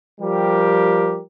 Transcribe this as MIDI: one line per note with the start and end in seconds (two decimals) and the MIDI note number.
0.21 1.21 53
0.21 1.21 55
0.21 1.21 67
0.21 1.21 70